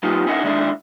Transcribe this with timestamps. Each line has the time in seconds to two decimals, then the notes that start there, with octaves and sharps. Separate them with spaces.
0.03 F#3 B3 D#4 F4 G4
0.27 C#4 D#4 E4 A#4 D#5 F#5
0.43 D3 D#3 G#3 D4 E4